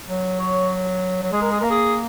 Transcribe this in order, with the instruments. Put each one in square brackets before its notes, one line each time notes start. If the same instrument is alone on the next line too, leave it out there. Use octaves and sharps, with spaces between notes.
[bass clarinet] F#3
[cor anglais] C#5
[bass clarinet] F#3
[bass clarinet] G#3 [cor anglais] G#4
[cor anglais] A#4
G#4
[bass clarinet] A#3 [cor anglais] A#4
[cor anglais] G#4